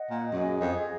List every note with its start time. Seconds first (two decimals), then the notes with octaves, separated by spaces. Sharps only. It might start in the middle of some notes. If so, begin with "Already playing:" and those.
Already playing: D#5 F#5
0.10 A#2
0.32 F#2 G#4
0.61 F2
0.75 D#5